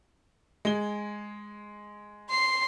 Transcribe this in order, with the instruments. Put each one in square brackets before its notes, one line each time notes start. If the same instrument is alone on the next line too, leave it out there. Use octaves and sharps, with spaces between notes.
[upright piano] G#3 G7
[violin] C6 C7